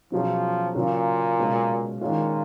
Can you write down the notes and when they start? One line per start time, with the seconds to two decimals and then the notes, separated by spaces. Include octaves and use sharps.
0.12 B2 F3 F#3 C#4 G#4
0.75 A#2 C#3 F#3 C#4 F4
1.38 B2 G#3 C#4
2.01 A#2 D#3 G#3 C#4 F4